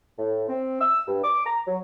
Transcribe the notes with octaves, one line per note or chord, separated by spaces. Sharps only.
A2
C4
E6
G2
D6
A#5
F#3